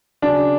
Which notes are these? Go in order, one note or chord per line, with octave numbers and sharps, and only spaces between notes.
C#3 F#3 D4